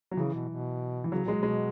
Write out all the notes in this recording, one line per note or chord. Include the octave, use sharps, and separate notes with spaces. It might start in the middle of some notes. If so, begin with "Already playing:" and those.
F#3
C#3 E3
B2
B2
E3
C#3 F#3
A#2 G#3
B2
G#3